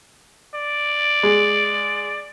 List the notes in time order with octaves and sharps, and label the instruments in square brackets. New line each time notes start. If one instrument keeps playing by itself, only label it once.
[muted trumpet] D5
[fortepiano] G#3